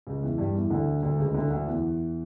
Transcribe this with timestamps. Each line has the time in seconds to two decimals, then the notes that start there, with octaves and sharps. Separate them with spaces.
0.07 C#2 C#3
0.22 E2 E3
0.38 G2 G3
0.55 E2 E3
0.70 D2 D3
1.02 D2 D3
1.18 C#2 C#3
1.34 D2 D3
1.50 D2 D3
1.66 E2 E3